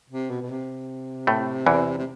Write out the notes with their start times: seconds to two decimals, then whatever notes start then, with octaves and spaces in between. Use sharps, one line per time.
0.10 C3
0.30 B2
0.42 B2
0.50 C3
1.27 A2 A3
1.66 E2 E3
1.98 C3